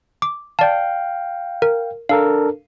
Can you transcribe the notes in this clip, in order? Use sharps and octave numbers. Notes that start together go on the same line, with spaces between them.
D6
D5 F5 G5 A5
A#4
D4 A4 A#4 F5